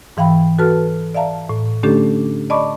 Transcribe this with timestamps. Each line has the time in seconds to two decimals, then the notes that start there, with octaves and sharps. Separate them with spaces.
0.17 G#2 E3 F5 G5 B5
0.59 F#4 A4 B4 A5 F6
1.15 D5 E5 F5 A5 A#5
1.49 A2
1.83 D3 A3 C#4 D4 G4 A4
2.50 D5 D#5 A5 B5 C#6 D6